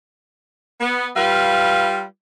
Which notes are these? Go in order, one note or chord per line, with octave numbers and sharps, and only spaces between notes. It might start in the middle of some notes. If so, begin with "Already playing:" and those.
B3
G3 F4 B4 F5